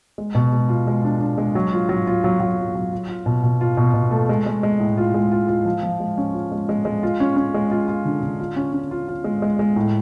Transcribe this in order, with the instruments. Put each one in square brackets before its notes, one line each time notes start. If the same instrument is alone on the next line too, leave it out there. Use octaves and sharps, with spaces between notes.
[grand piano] G#3
B2
G#3
F4
G#3
D4
D4
G#3
F#3
F4
F#3
F4
F#3
F#3
F4
F#3
F4
F4
B2
B2
F4
B2
B2
A3
G#3
G#3
G#3
A2
F4
G#3
F4
F4
F3
F3
G#3
C#4
F4
G#3
G#3
G#3
F4
C#4
C#4
G#3
F4
F4
D3
D3
F4
C#4
C#4
F4
F4
G#3
G#3
G#3
A2